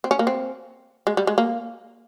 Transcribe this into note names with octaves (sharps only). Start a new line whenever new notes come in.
C4
C#4
A#3
C4
G#3
G3
G#3
A#3